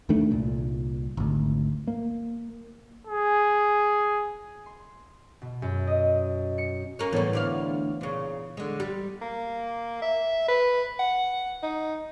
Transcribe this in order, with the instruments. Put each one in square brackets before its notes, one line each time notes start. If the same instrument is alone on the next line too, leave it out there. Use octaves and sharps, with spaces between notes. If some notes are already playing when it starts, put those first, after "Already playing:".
[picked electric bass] D#2 D#3 A3 D4
C2 A#2
G#1 D2
A#3
[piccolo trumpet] G#4
[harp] C6
B2
F#2
D#5
C#7
[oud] A#3 C#4
[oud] A2 G3 [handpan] E3 B3 C#5
[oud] D2 D5 F5
A#2 C#3
D3 G#3
G3
[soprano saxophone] A#3
E5
B4
F#5
D#4